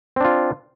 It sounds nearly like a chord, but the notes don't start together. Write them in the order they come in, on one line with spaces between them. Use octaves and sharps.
C4 D4 F4